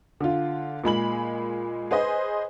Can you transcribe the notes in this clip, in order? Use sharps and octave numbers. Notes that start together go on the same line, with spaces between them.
D3 F4
A#2 G#3 B5 F#7
G#4 B4 C5 D#5